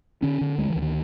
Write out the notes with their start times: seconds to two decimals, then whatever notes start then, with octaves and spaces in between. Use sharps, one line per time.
0.22 D3 C#4
0.41 D3
0.58 D2 G#3
0.70 E3
0.76 D2
0.82 D#3